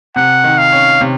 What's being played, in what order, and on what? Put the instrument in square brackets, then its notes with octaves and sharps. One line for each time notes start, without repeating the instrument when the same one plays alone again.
[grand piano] C3 [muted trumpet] F#5
[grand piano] D#3
[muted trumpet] F5
[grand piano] C#4
C3